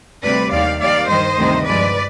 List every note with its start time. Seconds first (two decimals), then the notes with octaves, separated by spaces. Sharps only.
0.24 D2 C3 G3 B4 D5
0.52 D#2 D#3 G3 D5 F5
0.81 D#2 D#3 G3 D5 F5
1.09 G2 D#3 G3 C5 D#5
1.38 D2 C3 D#3 G3
1.66 G2 F3 G#3 B4 D5